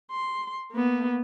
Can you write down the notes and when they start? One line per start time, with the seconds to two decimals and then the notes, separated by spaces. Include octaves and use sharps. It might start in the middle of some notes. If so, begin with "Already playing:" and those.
0.11 C6
0.71 A#3 B3